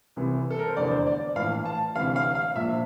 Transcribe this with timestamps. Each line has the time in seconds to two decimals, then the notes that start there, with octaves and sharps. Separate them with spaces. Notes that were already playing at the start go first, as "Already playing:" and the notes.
0.16 C2 C3 E3
0.50 A4
0.59 A#4
0.68 C5
0.76 F1 E2 D3 D5
0.91 C5
1.07 D5
1.35 A#1 A2 E3 F5
1.65 A5
1.95 D2 C3 E3 F5
2.16 F5
2.35 F5
2.55 A#1 A#2 E5